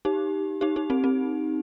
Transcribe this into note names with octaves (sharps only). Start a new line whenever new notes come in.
D#4 G4
D#4 G4
D#4 G4
C4 D#4
C4